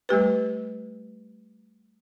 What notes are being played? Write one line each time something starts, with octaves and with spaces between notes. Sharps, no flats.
G3 A3 G4 B4